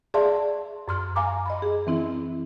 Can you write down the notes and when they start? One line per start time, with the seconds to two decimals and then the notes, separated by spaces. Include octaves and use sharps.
0.14 G#4 D5 E5 F5 A5 C6
0.88 F#2 C6 F6
1.16 F5 G#5 A#5 D6
1.46 D#5 B5
1.62 G#4
1.87 E3 C4 E4